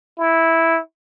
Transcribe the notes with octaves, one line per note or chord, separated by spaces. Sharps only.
E4